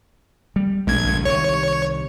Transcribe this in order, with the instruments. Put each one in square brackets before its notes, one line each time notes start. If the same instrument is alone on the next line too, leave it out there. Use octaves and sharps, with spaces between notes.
[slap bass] G3
[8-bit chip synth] A#1 G#6 [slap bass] G#3 A3 D4
[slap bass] G1 C3
[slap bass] C2 C3 D#3 [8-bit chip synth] C#5